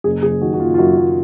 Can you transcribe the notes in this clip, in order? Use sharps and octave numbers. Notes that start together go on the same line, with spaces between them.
F#1 G#4
F#1 G#4
D#3 F#4
F#4
F#1 F4
F4
F#2 F#4
F#2